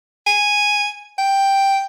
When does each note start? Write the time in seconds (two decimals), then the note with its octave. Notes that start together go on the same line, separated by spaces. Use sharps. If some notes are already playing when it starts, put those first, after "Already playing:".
0.26 G#5
1.18 G5